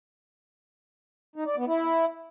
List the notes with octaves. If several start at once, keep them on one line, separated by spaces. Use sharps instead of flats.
D#4
D5
B3
E4